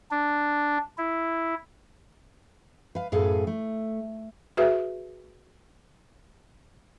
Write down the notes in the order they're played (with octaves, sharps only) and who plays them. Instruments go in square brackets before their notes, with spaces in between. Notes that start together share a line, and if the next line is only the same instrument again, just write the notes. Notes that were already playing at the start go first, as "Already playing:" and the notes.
[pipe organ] D4
E4
[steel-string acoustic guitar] B4 F5
F#2 A2 G#4 A4 B4 F5
A3
[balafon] F#4 G#4 B4 E5